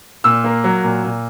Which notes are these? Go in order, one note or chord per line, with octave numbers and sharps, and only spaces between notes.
A#2 E6
A#3
F#3
A#2
A#2